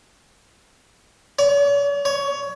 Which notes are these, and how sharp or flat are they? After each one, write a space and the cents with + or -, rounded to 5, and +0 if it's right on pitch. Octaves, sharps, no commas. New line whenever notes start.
C#5 +45
C#5 +20